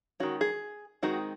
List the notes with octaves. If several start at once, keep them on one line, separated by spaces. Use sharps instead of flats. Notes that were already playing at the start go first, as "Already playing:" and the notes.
D#3 G#3 C#4 F#4
G#4
D#3 G#3 C4 D#4 F#4